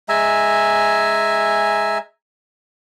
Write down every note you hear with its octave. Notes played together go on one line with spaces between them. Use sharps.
G#3 E5 G#5 A#5